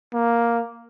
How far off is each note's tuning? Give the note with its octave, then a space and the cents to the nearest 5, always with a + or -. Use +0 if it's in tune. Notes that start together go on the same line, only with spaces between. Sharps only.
A#3 +5